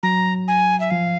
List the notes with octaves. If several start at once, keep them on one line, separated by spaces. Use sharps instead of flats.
F#3 A#5
G#5
E5
F3 F5